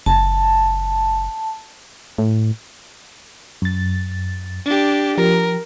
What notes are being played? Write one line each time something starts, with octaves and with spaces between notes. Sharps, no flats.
F#1 A5
A2
F#2 A6
D4 G4
F3 G4 A#4 A#5